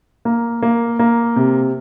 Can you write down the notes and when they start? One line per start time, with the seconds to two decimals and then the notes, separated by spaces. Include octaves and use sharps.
0.25 A#3
0.62 A#3
0.99 A#3
1.36 C3